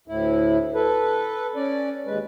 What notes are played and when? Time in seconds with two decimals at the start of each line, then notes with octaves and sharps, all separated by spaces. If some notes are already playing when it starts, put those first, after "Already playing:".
0.08 D2 A2 E4
0.74 A4 B4
1.56 C#4 D5
2.06 D#2 G#3 B4